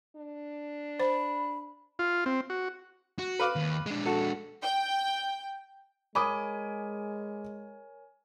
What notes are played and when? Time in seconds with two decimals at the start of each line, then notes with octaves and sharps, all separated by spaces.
0.16 D4
1.00 C5 B5
1.99 F4
2.26 C4
2.50 F#4
3.19 F#4
3.39 B4 F5 D6
3.56 D#2
3.86 G#3 D4
4.06 F#4 A4
4.63 G5
6.15 G#3 A#4 C#5 G#5 B5 D6 D#6